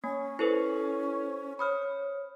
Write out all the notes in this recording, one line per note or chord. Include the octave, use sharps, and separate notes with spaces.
A#3 C#4 C#5 G#5
E4 A4 B4 C5
C5 C#5 B5 D#6 F6